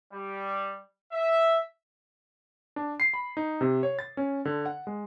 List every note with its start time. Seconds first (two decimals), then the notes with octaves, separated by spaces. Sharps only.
0.12 G3
1.12 E5
2.76 D4
3.00 C7
3.14 B5
3.37 D#4
3.61 C3
3.83 C#5
3.99 A6
4.17 C#4
4.45 D3
4.66 F#5
4.87 G#3